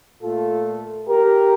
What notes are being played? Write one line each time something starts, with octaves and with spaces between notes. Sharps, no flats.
A#2 A3 F4 A4
G4 A#4